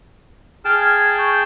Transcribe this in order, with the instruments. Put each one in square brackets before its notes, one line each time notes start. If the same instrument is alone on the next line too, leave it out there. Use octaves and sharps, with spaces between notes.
[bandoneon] G#4 G5 A5 [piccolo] F6
[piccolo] F6 [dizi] G#6
[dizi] C#6 [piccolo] G6